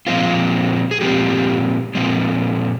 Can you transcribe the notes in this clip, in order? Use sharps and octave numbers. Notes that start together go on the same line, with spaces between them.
A#2 F3 G#3 C4 F4
G#4
A#2 F3 G#3 C4 G4
A#2 F3 G#3 C4